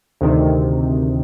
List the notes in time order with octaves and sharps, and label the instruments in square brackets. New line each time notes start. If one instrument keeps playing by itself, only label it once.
[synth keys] D2 C3 D#3